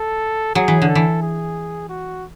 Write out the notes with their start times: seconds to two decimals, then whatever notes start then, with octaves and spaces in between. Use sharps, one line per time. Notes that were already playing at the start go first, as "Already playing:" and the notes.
Already playing: A4
0.55 F#3 G#4
0.68 E3
0.82 D3
0.89 A4
0.95 E3
1.22 G#4
1.89 F#4